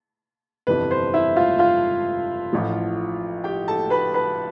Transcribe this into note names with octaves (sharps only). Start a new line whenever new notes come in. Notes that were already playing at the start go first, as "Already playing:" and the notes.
G1 F2 C3 E3 G3 B4
C5
E4 E5
F4 F5
F4 F5
A1 A2 F3
G4 G5
A4 A5
B4 B5
B4 B5